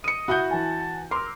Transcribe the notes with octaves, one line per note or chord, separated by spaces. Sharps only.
D#5 C#7 D#7
E4 F#4 F#5 G6
E3 G#5 A5
A#4 C6 D6 E6